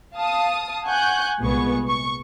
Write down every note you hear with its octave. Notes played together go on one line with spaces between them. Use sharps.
F5 A5 D#6
F#5 G#5 C#6 F#6 G6
C2 A#2 G#3 B3 G#4 C#6
C#6